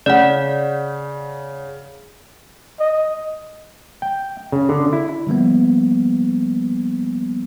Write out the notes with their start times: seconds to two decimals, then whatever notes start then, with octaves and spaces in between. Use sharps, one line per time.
0.06 C#3 D5 F#5
2.80 D#5
4.02 G5
4.52 C#3
4.69 D3
4.93 E4
5.27 D3 F3 G3 A#3 B3